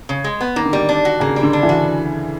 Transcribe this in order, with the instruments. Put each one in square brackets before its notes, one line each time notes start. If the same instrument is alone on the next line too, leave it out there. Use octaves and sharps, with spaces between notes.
[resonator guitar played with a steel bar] C#3
G#3
B3
[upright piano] D#3 [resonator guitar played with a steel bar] A#3
[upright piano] D3
[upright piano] D#3 [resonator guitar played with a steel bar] G3
[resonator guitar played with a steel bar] D4
F#4
[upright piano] C#3 [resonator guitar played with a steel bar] A#3
[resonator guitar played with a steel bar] G3
[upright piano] D3
[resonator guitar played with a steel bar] D4
[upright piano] E3
[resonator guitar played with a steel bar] F#4